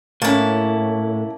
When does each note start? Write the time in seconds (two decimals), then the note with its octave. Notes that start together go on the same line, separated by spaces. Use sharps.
0.22 A2 A#3 C#4 E4 A5